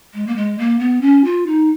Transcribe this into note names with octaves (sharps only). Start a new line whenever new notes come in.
G#3
A#3
G#3
A#3
B3
C#4
F4
D#4